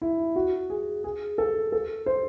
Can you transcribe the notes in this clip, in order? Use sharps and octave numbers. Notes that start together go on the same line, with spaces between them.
E4
F#4
G#4
G#4
A4
A4
C5